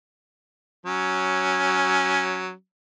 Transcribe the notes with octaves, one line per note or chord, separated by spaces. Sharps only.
F#3 C#4